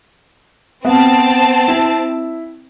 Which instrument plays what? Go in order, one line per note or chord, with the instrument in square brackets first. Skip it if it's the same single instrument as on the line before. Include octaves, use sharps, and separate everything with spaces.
[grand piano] B3 [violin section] C4 A5
[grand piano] E4